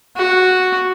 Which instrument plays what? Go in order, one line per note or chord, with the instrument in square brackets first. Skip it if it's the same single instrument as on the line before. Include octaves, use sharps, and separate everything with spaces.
[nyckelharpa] F#4